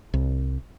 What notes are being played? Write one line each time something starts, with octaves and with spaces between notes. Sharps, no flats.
C2